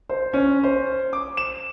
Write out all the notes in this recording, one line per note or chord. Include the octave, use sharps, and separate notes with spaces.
C5
C#4
C5
D6
E7